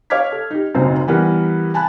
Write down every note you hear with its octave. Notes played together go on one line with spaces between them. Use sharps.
C#5 F5 D6 F6 G#6 B6
A4
D#4 G4
F#1 B1 F#2 C4 D#4 C5
E3 G3 B3 A#4
G#5 A5 B5 F#6